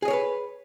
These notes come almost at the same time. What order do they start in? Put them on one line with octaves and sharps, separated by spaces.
G#4 D#5 C#5 A#4 B4